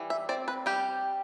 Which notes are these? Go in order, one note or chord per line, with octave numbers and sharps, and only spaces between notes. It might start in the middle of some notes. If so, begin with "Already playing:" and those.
Already playing: E3 G3
E5
C4 D5
B4
G3 G4